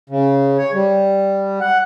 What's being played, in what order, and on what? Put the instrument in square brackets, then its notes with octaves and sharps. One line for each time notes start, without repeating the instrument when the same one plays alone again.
[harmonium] C#3
C#5
G3
F#5